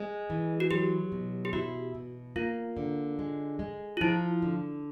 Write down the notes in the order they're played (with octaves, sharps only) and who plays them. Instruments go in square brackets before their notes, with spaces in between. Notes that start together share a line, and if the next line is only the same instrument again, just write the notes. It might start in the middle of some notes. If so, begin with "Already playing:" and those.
Already playing: [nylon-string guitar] G#3
E3
[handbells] F#4
[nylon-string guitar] F#3 [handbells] G4
[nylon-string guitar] B2
[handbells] G4
[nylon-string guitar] E4 [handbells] F#4
[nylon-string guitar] B2
[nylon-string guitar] A#3 [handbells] F4
[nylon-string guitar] D3
G#3
G#3
[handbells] F4
[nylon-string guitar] F3 [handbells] E4
[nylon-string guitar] D3